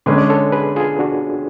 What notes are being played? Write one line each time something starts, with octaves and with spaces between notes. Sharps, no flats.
D3 G#3 C#4 B4 D5
D5
A4 C#5
G#4 B4
F4 G#4
D4 F#4